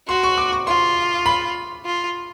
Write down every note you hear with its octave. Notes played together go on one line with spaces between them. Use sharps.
F#4 C6
C#6
D6
C#6
F4 C6
B5
F4